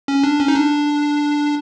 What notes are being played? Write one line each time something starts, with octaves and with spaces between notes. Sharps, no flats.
C#4
D4
C#4
D#4
D4